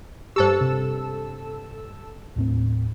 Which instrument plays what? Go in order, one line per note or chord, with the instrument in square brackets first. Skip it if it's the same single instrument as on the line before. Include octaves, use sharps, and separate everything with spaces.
[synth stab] G2 A4 E6 [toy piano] G4 C5
[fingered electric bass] C3
D#2 A2 C4